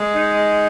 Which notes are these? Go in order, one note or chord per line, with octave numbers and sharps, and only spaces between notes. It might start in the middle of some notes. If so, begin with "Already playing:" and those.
Already playing: G#3
D#4